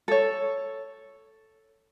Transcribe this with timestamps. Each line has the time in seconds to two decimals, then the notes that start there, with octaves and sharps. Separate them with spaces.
0.08 A4 C#5